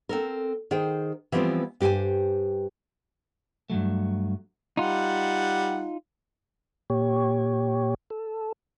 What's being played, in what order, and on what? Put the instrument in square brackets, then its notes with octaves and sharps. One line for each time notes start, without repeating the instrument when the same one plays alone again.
[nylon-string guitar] C4 A4 A#4
D#3 G#4 C5 G5
E3 F3 G3 B3 C4 F4
G2 G4 G#4 C5 G#5
[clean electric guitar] G2 E3 F#3 A3
[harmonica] G3 F#5 [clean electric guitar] D#4 F4
[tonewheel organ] A#2 G4 C#5
A4